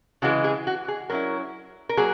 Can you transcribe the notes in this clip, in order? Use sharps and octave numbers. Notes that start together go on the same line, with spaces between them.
C#3 E3 G#3 F#4
G#4
F#4
G#4
F#3 C#4 E4 A#4
A#4
F#3 A#3 G#4